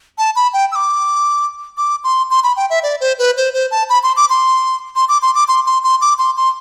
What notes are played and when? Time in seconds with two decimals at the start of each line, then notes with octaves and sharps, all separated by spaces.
0.18 A5
0.36 B5
0.53 G5
0.72 E6
0.75 D6
1.77 D6
2.04 C6
2.31 C6
2.43 B5
2.56 G5
2.70 E5
2.83 D5
3.01 C5
3.19 B4
3.37 C5
3.54 C5
3.71 A5
3.89 B5
4.03 C6
4.16 D6
4.30 C6
4.96 C6
5.09 D6
5.22 C6
5.35 D6
5.48 C6
5.66 C6
5.83 C6
6.01 D6
6.19 C6
6.37 C6